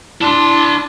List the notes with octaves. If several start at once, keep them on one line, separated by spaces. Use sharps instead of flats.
D4 E4 C6